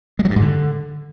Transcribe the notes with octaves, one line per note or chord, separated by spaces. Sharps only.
G#3
F#3
G2
G#2
D3